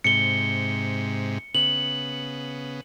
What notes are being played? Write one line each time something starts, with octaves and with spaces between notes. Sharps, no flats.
G#2 C3 C#7 G7
C#3 B3 F#7